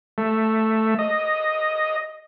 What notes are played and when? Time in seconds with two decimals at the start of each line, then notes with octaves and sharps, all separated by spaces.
0.18 A3
0.99 D#5